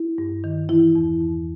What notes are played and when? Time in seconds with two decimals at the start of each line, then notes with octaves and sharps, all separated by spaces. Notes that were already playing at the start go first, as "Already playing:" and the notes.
Already playing: E4
0.18 G2
0.44 D#3
0.69 E3 E4
0.95 E2
1.21 E2